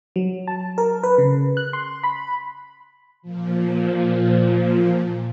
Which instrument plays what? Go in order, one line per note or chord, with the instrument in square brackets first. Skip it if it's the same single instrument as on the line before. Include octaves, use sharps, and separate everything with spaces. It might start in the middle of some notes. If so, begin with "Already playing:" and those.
[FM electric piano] F#3
A5
A#4
B4
C#3
F#6
C6
B5
[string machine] A#2 F3